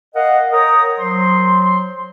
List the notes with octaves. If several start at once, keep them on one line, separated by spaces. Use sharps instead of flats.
A#4 D#5 F5 F#5
A#4 C#5 G5 A#5 D#6
F#3 C5 C6